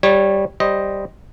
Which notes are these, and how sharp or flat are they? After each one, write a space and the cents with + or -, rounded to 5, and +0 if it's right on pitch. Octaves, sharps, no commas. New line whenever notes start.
G3 +0 C#5 -15
G3 +0 C5 +0 D#5 +0